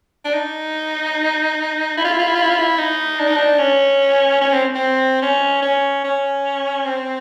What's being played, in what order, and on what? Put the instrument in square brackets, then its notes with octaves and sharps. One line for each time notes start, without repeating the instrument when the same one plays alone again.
[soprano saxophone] D4
D#4
E4
F4
E4
F4
E4
F4
E4
F4
E4
D#4
D4
D#4
D4
C#4
C#4
C4
C4
C#4
C#4
C#4
C4